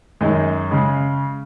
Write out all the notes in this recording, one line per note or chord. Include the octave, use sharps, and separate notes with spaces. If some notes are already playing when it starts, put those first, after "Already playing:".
F#2 D#3 G#3 D#4
C#3 G#3